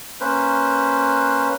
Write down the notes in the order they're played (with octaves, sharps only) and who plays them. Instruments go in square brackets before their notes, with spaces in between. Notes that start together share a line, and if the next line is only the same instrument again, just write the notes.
[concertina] A#3 C#4 B4 C5